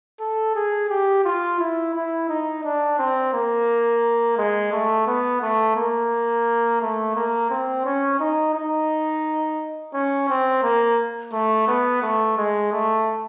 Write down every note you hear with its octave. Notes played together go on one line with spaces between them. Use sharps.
A4
G#4
G4
F4
E4
E4
D#4
D4
C4
A#3
G#3
A3
B3
A3
A#3
A3
A#3
C4
C#4
D#4
D#4
C#4
C4
A#3
A3
B3
A3
G#3
A3